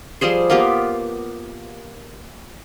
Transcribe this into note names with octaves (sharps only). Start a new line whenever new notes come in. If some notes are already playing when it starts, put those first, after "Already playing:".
F3 G3 G#4 C5
A#3 B3 F4 G4